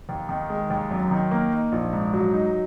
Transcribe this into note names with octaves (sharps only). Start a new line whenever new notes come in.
D#2
D#3
G#3
D#2
F#2
D#3
A#3
D#4
A#1
G#2
F#3
D#4